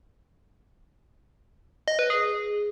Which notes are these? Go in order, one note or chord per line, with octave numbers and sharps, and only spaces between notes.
D#5
B4
G#4